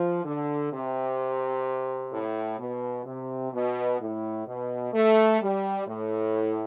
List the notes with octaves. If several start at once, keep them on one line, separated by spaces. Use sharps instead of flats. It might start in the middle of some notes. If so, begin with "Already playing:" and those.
Already playing: F3
D3
C3
A2
B2
C3
B2
A2
B2
A3
G3
A2